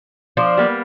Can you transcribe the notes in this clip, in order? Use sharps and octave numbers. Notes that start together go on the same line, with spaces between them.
F3 D4 C5
G3 A#3 B3